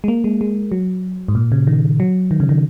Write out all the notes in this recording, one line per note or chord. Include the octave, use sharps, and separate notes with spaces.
G#3
A#3
G#3
G#3
F#3
G#2
A#2
C#3
D#3
F#3
D#3
C#3
D#3